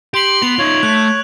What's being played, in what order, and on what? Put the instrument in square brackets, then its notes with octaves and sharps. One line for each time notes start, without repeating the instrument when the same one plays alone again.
[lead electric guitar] G4 [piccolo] C6 [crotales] D7 F#7
[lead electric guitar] B3 [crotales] F7
[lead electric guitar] D#4 F4 [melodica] C#5
[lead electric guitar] A3 [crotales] F#6